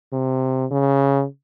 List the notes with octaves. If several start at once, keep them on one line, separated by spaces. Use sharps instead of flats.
C3
C#3